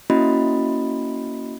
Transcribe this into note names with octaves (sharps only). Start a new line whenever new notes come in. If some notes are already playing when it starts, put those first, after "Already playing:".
A#3 C#4 E4 F#4 D#5 B5